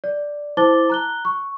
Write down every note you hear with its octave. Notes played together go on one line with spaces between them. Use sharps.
D5
E4 C5 A5 D6 A6 G7
A#5 F#6 G7
C#6